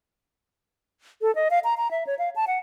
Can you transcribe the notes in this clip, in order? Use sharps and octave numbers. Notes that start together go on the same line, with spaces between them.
A4
D#5
F5
A#5
A#5
E5
C#5
F5
A5
F#5